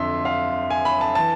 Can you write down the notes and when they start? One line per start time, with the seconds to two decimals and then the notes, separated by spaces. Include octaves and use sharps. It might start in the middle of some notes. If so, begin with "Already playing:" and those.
Already playing: F2 D3 E5 C6
0.25 F5
0.70 G#5
0.85 B5
1.01 A5
1.15 E3 A5